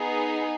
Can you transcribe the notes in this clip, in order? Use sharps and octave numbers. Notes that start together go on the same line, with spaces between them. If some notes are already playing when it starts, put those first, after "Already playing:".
Already playing: B3 D#4 G#4